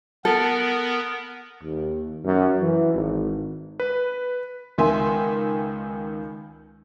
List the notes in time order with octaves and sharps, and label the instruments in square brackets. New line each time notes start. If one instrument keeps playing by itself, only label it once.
[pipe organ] B3 A#4 [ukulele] A4
[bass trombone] D#2
F#2
E3
G#1
[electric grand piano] B4
[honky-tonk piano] C#2 D#3 E5 G#5 C6